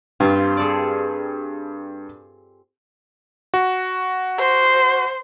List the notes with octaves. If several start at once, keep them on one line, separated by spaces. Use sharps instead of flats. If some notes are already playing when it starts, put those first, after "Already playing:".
G2 C4 F4 G4
G#4 A4 D5
F#4
C5